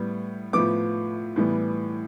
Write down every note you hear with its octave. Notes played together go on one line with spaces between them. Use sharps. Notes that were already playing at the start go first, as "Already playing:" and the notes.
Already playing: A2 G3 B3
A2 F3 B3 D6
A2 E3 G3 B3